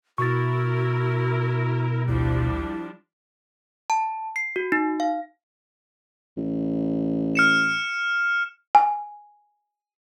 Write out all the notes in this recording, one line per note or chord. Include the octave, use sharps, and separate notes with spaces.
B2 E4 F#4 A#4 C#6 A6
A1 D2 F3 G3 D4 E4
A5
C7
F#4
D#4
F5
A1
F6 C#7 E7
G#5